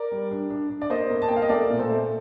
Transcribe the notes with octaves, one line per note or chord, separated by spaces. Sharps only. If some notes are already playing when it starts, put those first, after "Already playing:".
Already playing: A#4 D5
G3
D4
D4
D4
D5
A#3 C5 D#5
A#3
A5
A#3 G5
F5
D#5
A3 A#4 D5
A#2
A4 C5
A3